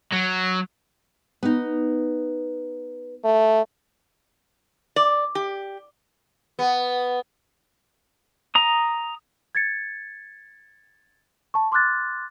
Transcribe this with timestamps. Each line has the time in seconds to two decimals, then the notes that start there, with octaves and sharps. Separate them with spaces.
0.12 F#3
1.43 B3 D#4
3.25 A3
4.96 D5
5.35 G4
6.59 B3
8.55 A#5 D#6
9.55 G#6 A6 C#7
11.54 A5 C#6
11.72 C6 D6 F6 F#6 A6